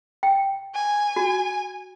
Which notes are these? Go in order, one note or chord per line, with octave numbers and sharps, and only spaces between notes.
G5
G#5
F#4